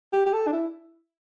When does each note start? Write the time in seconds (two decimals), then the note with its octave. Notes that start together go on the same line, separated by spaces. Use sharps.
0.13 G4
0.26 G4
0.33 A4
0.47 D4
0.53 E4